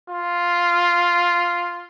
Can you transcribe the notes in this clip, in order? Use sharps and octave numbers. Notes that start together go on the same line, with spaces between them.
F4